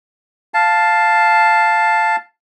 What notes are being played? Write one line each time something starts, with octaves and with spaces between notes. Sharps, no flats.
F5 A5